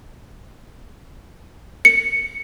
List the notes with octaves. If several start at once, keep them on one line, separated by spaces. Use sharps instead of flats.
C#7